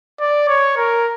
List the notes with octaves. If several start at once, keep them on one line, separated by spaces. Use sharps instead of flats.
D5
C#5
A#4